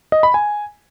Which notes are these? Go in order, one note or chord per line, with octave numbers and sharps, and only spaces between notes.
D#5
B5
G#5